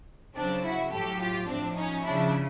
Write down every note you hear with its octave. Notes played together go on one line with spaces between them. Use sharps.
C#3 F#3 C4 D4
E4 F#4
A2 F#3 G4 A4
F4 G4
A2 F3 C4 D4
C#4 D#4
C#3 F3 D4 E4